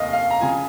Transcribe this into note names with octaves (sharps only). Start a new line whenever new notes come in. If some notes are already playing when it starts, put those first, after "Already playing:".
Already playing: F1 D#2 D#5 F5
F5
A#5
C#3 F3 G#5